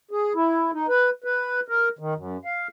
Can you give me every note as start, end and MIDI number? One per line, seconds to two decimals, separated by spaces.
0.11 0.33 68
0.35 0.71 64
0.73 0.87 63
0.88 1.10 71
1.24 1.60 71
1.68 1.89 70
1.99 2.14 51
2.15 2.37 42
2.45 2.68 77